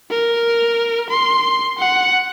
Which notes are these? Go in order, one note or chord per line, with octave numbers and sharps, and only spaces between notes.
A#4
C6
F#5